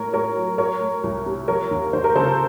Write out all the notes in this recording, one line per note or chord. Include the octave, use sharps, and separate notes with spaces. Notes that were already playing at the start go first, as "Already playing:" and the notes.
Already playing: A2 A#4 C#5
A2 A#4 C#5
F#3
F#3 A#4 C#5
A3
C2
C3
F3 A#4 C#5
D#2
D#2 C5
A#4
C#3 A4 C5